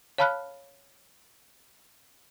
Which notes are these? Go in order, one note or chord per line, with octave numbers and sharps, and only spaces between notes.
C#5 F5 A5 B5 F6 F#6